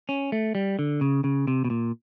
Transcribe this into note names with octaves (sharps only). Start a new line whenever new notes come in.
C#4
A3
G3
D3
C#3
C#3
C3
B2
A#2